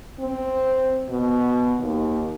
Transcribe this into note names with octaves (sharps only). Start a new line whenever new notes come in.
C4
B2
D#2